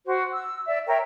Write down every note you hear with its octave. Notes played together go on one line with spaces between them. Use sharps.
F#4 C5
E6
D5 E5
A#4 C#5 E5 G5